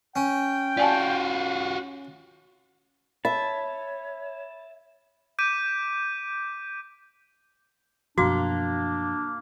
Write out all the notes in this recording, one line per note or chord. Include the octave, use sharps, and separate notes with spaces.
C#4 G5
F4 F#4 D5 G#5 A5
C#5 E5 A5 B5
D6 G6 B6 D7 D#7
F#2 B2 F3 A#3 D4 F#4